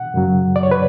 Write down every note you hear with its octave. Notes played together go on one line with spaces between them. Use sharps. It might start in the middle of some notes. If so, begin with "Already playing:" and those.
Already playing: F#5
F#2 C#3 F#3
D5
C#5
B4